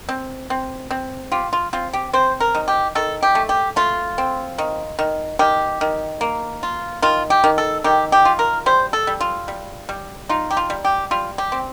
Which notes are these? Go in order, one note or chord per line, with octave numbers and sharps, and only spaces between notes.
C4
C4
C4
F4 G4
F4
C4 F4
G4
C4 C5
A#4
D#3
G4
D#3 A4
G4
A3
G4
A3 F4
C4
D#3
D#3
D#3 G4
D#3
A#3
F4
D#3 F4
G4
D#3
A4
D#3 G4
G4
F4
A#4
G3 C5
A4
G3
F4
G3
G3
D#4 F4
G4
F4
G3
G4
G3 F4
G4
C4